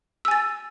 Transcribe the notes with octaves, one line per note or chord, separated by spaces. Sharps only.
G#5 E6 A6